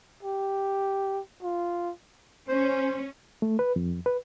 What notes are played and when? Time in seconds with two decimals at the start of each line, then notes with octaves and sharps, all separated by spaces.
0.23 G4
1.43 F4
2.49 C#4 C5
3.42 A3
3.59 B4
3.76 F2
4.06 B4